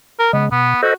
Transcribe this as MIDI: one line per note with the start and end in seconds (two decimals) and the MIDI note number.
0.19 0.31 70
0.33 0.49 49
0.33 0.49 56
0.33 0.45 59
0.52 0.74 47
0.52 0.80 59
0.83 0.92 66
0.83 0.94 69
0.83 0.94 72
0.83 0.94 75